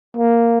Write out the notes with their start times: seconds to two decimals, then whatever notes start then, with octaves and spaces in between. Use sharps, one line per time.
0.17 A#3